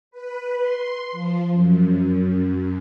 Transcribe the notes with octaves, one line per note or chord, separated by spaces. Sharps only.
B4
C6
F3
F#2